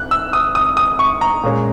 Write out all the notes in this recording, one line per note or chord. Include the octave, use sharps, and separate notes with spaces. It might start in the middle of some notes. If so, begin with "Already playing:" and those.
Already playing: F#6
E6
D#6
D#6
D#6
C#6
A#5
A#2 G#3 C#4